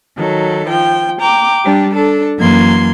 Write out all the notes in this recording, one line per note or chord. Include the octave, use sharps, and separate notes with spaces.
D#3 F#3 A4
F3 G5
G5 A#5 D6
G3 D4 G4
D4 A4
F#2 E3 A#3 C6 G#6